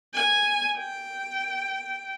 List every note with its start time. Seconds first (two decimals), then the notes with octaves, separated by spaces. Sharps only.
0.14 G#5
0.78 G5